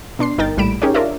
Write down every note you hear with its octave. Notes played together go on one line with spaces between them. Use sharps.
B2 D4 C6 C7
G1 D#4 A#4 G5 A6
A#1 A2 G3 B5 D7 E7
C#4 D#4 G4 G#4 A#4 C#5
D4 F4 A#4 C#5 D5 E5